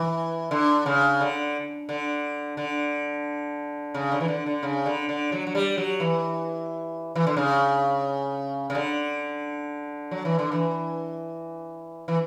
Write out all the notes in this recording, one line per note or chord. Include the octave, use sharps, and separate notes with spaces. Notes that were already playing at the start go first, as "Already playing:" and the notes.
Already playing: E3
D3
C#3
D3
D3
D3
C#3
D3
E3
D3
D3
C#3
D3
D3
F#3
F#3
G3
F#3
E3
E3
D3
C#3
C#3
D3
F#3
E3
D3
E3
E3